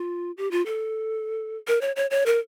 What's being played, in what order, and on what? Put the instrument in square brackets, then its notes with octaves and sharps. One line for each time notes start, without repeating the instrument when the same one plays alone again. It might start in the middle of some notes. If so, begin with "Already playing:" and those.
Already playing: [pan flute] F4
G4
F4
A4
A#4
C#5
C#5
C#5
A#4